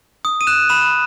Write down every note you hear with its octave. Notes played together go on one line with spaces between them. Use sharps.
D#6
D#7
F#6 E7
B5 E7